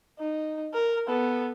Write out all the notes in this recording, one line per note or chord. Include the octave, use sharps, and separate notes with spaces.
D#4
A#4
B3 A4